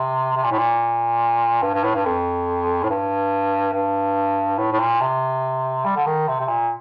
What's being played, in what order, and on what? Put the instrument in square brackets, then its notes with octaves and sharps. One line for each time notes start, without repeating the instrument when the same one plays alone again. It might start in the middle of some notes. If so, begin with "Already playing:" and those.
Already playing: [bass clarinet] C3
C3
A#2
A2
A#2
G2
G2
A2
G2
F2
A2
G2
G2
A2
A2
A#2
C3
G3
D3
D#3
C3
C3
A#2